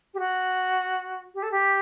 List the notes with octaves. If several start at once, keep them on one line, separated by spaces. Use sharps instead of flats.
G4
F#4
G4
A4
G4